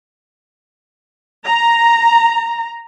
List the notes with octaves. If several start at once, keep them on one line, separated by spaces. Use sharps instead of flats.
A#5